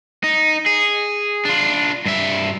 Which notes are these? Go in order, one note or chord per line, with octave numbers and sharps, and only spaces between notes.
D#4
G#4
D4 F4
G2 E5